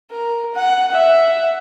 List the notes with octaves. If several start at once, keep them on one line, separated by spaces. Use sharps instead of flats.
A#4
F#5
E5 F#5